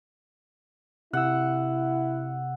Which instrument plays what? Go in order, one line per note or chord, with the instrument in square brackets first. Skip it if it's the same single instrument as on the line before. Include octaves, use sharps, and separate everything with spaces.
[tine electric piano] C3 E6 [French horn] E4 [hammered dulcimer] F#5